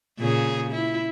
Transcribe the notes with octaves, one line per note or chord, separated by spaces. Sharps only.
A#2 C#3 G#4
E4